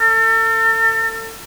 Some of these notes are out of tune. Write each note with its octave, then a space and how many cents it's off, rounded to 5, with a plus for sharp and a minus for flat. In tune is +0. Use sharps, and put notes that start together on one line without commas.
A4 +40